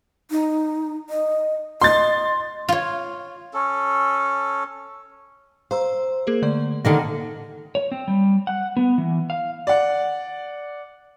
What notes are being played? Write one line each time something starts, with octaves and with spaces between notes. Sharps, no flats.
D#4
D#5
D#5 C6 A6
F4 C#5
C#4 A4
C5 F5 A#5 E6
A#3 G#4 A#4
D3 A3 D5
D3 D#3 A#3 A#6 C#7
C#5
C4
G3
F#5
B3
E3
F5
D5 F#5